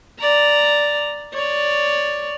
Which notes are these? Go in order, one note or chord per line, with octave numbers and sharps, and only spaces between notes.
D5 A#5
C#5 D5